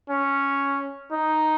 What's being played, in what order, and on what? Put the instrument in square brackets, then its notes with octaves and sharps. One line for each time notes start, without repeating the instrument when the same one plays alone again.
[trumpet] C#4
D#4